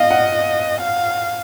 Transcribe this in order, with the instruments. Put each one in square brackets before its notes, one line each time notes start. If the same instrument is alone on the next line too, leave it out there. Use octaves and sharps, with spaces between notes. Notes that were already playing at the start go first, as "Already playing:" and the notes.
Already playing: [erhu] D#5 [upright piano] F5
[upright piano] F#5
[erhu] F5